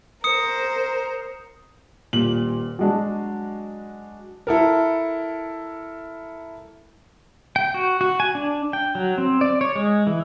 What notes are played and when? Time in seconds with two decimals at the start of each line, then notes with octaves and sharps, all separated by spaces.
0.24 A#4 C5 D#6 C#7
2.13 D#1 A#2 F#7
2.79 F#3 G#3 D4
4.47 E4 A4 A#4
7.56 G5
7.74 F#4
8.01 F#4
8.20 G#5
8.35 D4
8.73 G5
8.95 F#3
9.18 C4
9.41 D5
9.61 C#5
9.75 G#3
10.07 E3